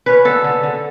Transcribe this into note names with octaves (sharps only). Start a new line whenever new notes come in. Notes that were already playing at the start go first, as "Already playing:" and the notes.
C#4 B4
D3 A4
D3
D3